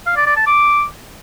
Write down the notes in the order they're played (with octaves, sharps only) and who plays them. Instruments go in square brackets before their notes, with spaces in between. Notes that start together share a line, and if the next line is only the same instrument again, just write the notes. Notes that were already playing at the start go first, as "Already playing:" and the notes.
[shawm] F5
D5
D5
A5
D6